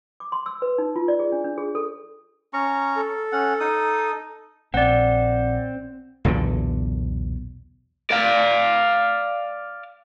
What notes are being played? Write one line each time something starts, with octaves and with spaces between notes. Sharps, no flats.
D6
C6
E6
B4
D#4
F4
D5
G#4
D4
D4
G#4
A4
C#4 A#5 C#6
A4
C#4 F#5
D#4 D#6
A#1 C4 D5 F#5
B1 E2 A#2 D3
D5 F5